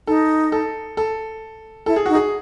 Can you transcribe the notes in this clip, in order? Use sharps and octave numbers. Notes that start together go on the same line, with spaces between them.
D#4 A4
A4
A4
E4 A4
G#4
D#4 F#4
G#4